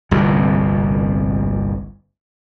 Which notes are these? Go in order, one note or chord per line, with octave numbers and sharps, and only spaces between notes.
G1 C2 F2 A#2